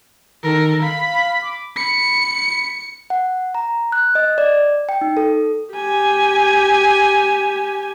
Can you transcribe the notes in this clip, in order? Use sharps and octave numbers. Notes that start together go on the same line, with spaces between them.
D#3 A4 A#4
F5 B5
D6
B5 C#7
F#5
A#5
F#6
D#5
D5
G5
D#4
A4
G4 G#5